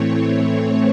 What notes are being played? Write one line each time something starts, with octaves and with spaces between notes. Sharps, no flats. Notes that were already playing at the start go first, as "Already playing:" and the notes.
Already playing: A2 E3 A3 C4 C#5